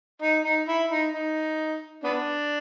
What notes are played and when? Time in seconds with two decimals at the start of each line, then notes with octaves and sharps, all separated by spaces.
0.22 D#4
0.45 D#4
0.68 E4
0.91 D#4
1.13 D#4
2.04 B3 D4